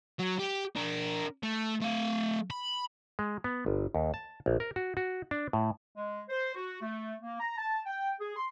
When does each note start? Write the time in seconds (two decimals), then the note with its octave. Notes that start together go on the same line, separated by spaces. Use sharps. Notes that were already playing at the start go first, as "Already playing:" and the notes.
0.20 F#3
0.40 G4
0.76 D4 A#4
1.43 A3
1.82 A3 F5
2.50 B5
3.19 G#3
3.44 B3
3.66 G1
3.95 D#2
4.14 A5
4.46 A#1
4.60 A#4
4.76 F#4
4.97 F#4
5.31 D4
5.53 A2
5.96 G#3
6.29 C5
6.55 F#4
6.82 A3
7.23 A#3
7.40 A#5
7.58 A5
7.86 G5
8.20 G#4
8.37 C6